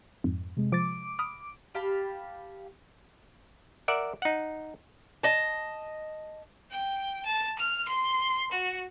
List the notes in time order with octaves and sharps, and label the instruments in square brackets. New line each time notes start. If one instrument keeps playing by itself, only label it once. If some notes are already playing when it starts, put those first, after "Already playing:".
[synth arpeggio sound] F2 G#2
[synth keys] C3 G#3
[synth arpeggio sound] F3 A6 [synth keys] D6 D7
[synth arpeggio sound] B5 D#6 F6
[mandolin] G4 F5 A5 B5
[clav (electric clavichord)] A#4 D5 E5 F#5
D#4 F#5
[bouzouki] D#5 A5
[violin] G5
A5
F6
C6
F#4